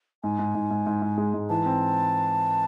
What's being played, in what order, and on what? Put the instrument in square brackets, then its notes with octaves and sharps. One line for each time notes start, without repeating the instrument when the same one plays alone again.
[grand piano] G#2 [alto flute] G#5
[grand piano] G#2
G#2
G#2
G#2
G#2
G#3
G#2
[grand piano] E3 [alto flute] A5
[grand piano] C4